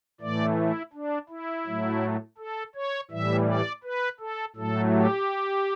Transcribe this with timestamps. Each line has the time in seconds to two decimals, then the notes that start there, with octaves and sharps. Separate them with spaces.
0.21 A2 E3 A3 D5
0.57 E4
0.93 D4
1.29 E4
1.66 A2 F#3 A3
2.38 A4
2.75 C#5
3.11 A2 E3 G3 E5
3.47 D5
3.83 B4
4.20 A4
4.56 A2 F#3 A3 A4
4.92 G4